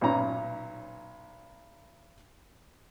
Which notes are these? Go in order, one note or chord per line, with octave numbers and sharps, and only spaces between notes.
B1 A#2 C#4 A#5